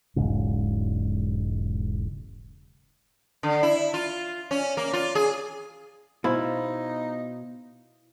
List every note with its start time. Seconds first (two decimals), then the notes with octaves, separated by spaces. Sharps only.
0.16 E1 B1 G#2 C#3
3.43 D3
3.63 E4
3.94 F4
4.51 C#4
4.77 A#3
4.93 F4
5.15 G#4
6.24 B2 D#4 E4 C5 F5